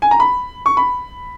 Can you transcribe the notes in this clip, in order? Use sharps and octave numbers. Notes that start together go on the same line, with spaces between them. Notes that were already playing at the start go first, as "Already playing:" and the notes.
G#5
A#5
B5
C#6
B5